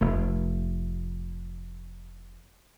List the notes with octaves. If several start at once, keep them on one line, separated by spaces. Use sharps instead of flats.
F1 A3